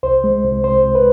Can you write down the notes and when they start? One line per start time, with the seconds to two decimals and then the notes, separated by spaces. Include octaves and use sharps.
0.03 C2 C5
0.24 G#3
0.44 C2
0.64 C2 C5
0.84 C2
0.95 B4